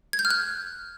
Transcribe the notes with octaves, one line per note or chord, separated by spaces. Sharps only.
G#6
G6
F6
F#6